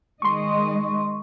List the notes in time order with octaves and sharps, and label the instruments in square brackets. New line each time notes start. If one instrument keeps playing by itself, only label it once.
[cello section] D#3 G#3 D#5 [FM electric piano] C6 C#6